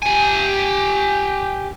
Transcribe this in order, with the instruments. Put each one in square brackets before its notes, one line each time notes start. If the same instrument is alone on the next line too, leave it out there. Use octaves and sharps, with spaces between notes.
[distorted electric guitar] G4 G#5